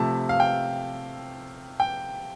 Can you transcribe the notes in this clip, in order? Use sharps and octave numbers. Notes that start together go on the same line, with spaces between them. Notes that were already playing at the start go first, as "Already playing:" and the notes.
Already playing: C3 F3 A3 A5
F5
G5
G5